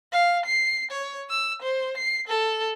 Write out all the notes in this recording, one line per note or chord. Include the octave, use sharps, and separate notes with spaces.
F5
C7
C#5
E6
C5
C7
A4